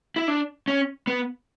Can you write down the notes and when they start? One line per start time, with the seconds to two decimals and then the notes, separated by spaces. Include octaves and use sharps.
0.16 E4
0.28 D4
0.68 C#4
1.07 B3